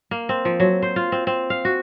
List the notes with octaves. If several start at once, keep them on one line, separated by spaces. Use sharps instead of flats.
A#3
C4
F3
F#3
C5
F4
C4
C4
F5
F#4